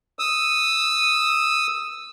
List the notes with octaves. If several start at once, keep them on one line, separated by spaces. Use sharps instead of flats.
D#6 E6